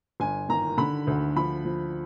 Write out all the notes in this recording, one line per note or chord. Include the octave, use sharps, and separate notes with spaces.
G1 G#5
D#3 A#5
D3 B5
D2
F3 B5
F3